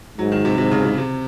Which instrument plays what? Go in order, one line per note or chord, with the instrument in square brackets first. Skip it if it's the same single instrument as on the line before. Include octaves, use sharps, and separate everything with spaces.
[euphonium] G#2 [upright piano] F#3
[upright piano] D#3
C3
[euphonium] G#2 [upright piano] C3
[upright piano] C#3
C3
C3